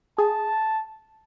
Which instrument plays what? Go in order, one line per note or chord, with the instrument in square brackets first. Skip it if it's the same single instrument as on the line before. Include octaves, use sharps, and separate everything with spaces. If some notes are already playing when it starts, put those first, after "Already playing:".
[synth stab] G#4 [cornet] A5